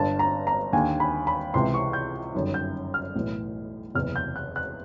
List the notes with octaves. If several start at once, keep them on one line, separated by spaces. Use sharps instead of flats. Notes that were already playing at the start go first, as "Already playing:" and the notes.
Already playing: G1 G2 D3 A5
A#5
A#5
D#2 D3 G#5
B5
B5
C#2 C3 E3 C6
C#6
G6
G1 F#2 D#3
G6
F6
B1 A2 E3
F#1 E2 C3 F6
G6
F#6
F#6